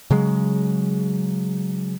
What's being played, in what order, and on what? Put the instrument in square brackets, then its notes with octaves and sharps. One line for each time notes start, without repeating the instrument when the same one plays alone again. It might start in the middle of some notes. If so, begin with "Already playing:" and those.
[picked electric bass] C#3 F#3 G#3